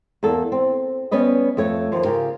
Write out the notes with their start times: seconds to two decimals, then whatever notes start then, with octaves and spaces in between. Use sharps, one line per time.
0.23 E2 A#3 A4
0.52 C4
1.11 G3 B3 C#4 B4 D#5
1.57 F2 A3 C#5
1.92 D#2 F3
2.05 C#3 F4 G4 A#4